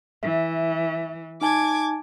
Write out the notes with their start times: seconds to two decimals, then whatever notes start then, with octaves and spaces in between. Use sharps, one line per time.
0.23 E3 E5
1.41 D#4 G#5 A5 D6 G#6